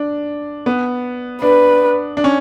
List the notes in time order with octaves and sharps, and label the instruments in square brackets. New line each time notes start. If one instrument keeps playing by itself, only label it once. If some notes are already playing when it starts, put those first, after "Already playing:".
Already playing: [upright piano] D4
B3
[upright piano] D4 [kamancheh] B4
[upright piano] D4
C#4